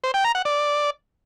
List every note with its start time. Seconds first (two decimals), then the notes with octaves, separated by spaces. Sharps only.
0.04 C5
0.14 G5
0.24 A#5
0.35 F#5
0.45 D5